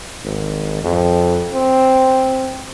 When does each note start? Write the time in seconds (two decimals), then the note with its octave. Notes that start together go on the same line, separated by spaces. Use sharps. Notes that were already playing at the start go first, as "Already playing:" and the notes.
0.24 G#1
0.83 F2
1.54 C4